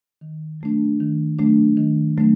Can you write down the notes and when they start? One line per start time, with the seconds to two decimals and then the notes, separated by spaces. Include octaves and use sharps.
0.21 D#3
0.61 F#3 A3 D4
1.00 D#3
1.39 F#3 A3 D4
1.77 D#3
2.18 F#3 A3 D4